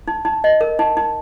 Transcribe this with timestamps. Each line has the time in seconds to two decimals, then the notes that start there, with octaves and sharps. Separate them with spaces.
0.08 D#4
0.25 D#4
0.44 D#5
0.61 A#4
0.79 D#4
0.97 D#4